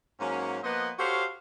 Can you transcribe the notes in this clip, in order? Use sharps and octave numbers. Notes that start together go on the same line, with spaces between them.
G#2 F#3 A#3 C#4
F3 A#3 B3 B4 D#5
F#4 G4 A4 C5 C#5 F5